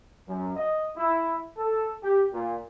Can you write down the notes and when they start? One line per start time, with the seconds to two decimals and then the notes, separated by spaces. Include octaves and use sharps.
0.28 F#2
0.56 D#5
0.97 E4
1.57 A4
2.04 G4
2.33 A#2